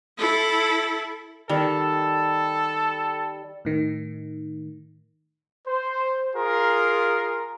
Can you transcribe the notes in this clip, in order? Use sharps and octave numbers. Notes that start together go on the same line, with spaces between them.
E4 A4
D#3 G3 A4 E6
A2 D#3
C5
F4 G#4 A#4